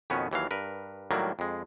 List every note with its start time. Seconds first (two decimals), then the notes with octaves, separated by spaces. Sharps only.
0.10 F2 B2 D#3 B3 C#4
0.31 D#2 E3 F#3 F5
0.51 G2 A#4 B4
1.11 A2 D#3 F#3 G3 A#3
1.39 F2 G#3